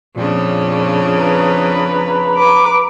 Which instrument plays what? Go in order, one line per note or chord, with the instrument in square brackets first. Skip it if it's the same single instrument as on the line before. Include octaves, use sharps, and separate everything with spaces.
[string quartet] F2 C#3 D4 [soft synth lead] A#2
[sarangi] B4 [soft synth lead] A#5
[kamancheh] B4 D6